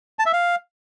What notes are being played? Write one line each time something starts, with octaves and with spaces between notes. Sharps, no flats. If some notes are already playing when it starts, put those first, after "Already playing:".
A5
E5
F5